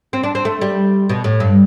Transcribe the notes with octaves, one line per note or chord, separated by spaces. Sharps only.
C4
D4
C4
A3
G3
B2
A2
G2